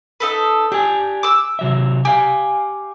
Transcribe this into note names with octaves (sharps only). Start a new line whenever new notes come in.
D#4 A4 B4
D4 G4 G#5
D6 E6
C3 F#3 E5
G4 F5 G#5